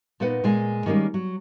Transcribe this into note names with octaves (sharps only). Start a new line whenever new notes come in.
A#2 B3 D#4 B4 F#5
A#2 G#3 G#5
D#3 G3 G#3 A#3 C#4
F#3